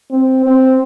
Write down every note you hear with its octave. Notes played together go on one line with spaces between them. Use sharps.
C4
C4